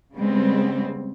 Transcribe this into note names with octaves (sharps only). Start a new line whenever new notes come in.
C#3 G3 G#3 B3 C4